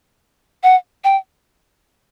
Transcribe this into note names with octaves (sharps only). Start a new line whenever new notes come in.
F#5
G5